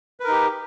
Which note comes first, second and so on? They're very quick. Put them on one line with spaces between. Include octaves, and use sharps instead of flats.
B4 A#4 D#4 G4